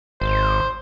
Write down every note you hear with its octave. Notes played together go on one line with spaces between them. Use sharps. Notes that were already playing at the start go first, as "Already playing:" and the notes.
G#1 C5